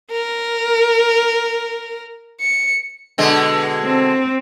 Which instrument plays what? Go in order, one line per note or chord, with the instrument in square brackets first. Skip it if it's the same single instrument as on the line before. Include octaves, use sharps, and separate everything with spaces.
[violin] A#4
C#7
[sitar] B2 D3 G#3
[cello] C4